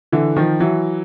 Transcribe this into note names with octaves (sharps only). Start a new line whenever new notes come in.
D3 E3
D#3 F3
E3 F#3